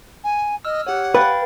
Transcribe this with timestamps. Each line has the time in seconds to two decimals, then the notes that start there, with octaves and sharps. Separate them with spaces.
0.24 G#5
0.65 D#5 E6 F6
0.86 G4 C#5 F#5
1.15 B4 F5 G5 A6